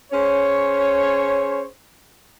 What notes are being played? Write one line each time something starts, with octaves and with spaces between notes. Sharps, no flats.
C#4 G#4 C5 C#5